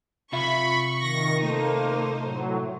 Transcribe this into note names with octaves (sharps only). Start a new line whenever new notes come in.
C3 F4 E5 B5 C#6
D#3 A#6
A3 A#3 D#4 C5
A2 F#3